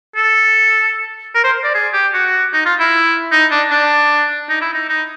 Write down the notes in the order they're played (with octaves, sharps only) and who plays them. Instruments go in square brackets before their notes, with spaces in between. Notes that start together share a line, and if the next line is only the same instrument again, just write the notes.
[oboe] A4
A#4
C5
D5
G#4
G4
F#4
D#4
F4
E4
D#4
D4
D4
D#4
E4
D#4
D#4